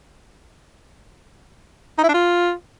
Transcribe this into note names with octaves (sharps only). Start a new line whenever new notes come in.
D#4
E4
D4
F4